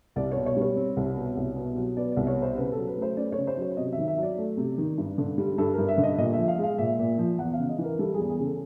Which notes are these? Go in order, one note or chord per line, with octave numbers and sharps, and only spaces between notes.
C2 D5
B2 C#5
C#5
G3
C#5
C4
C2
B2
C2
B2
F#3
B3 D5
C2 D5
C#5
B2 C5
C#3 B4
A4
F#3
B4
A3 C5
C#4 D5
C#3 C#5
C5
F#3 C#5
C3 D#5
D#3 E5
E5
F#3 D5
A3
C3
D#3
G2
D3
G3
G2 A4
A#4
G2
E5
D3
D#5
A#2 D#5
F3 E5
F5
G#3 F5
A#2 E5
A#2
F3
E2 F#5
F5
C#3
D#5
E3
A#4
G3 A4
E2 G#4
G#4
C#3
A4